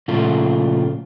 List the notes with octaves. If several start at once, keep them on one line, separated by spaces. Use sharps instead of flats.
A#2 C#3 F3 A3 F4